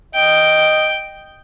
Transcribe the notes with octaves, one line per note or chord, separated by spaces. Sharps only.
D#5 G5